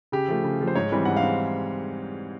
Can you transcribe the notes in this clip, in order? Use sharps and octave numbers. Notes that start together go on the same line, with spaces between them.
C#3 G4
F3 A3
C#3
F3 A3
C5
G#2 C#5
E3 G3 C4
G#2 F#5
F5
C4